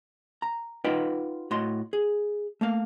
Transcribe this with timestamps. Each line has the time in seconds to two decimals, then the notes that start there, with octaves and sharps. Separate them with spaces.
0.42 A#5
0.84 D#4 F4 B4 F#5 G5
1.51 A2 F#4 D#5 C6
1.93 G#4
2.61 A3 A#3 F5